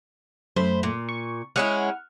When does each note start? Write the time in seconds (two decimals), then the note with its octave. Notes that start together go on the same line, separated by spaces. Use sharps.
0.56 F#2 A3 C5 B5
0.83 A#2
1.09 C#6
1.56 G#3 C#4 E4 F#5 F6